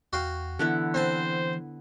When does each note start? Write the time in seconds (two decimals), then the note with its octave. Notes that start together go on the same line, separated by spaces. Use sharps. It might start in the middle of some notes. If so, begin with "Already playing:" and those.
0.13 E2 F#4 F5 G5
0.59 D3 E3 B3 E4
0.94 C4 C5 G#5 A5